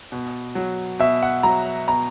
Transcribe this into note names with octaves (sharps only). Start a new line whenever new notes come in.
B2
F#3
B2 E5
F#5
F#3 A#5
B2 A#5